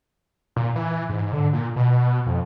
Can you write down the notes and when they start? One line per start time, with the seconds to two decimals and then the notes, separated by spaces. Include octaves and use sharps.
0.56 A#2
0.76 E3
1.09 G#2
1.33 D3
1.53 A#2
1.76 B2
2.26 F2